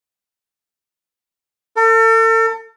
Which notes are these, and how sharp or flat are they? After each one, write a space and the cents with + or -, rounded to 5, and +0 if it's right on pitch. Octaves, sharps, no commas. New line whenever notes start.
A4 +40